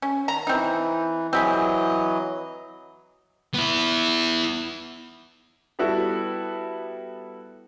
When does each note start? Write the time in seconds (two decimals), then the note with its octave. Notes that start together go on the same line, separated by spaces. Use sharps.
0.02 C#4
0.28 D#3 A#5
0.47 E3 C4 D#4
1.33 E3 F#3 C4 G4 G#4 D#5
3.54 B3 E4
5.79 G3 B3 E4 F#4 A4